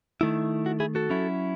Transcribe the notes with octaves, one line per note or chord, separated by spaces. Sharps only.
D#3 A3 E4
F#4
E4 G#4
F#4 A4
F#3 C#4 E4